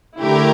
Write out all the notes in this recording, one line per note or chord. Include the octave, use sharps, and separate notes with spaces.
D3 A3 E4 G4 A#4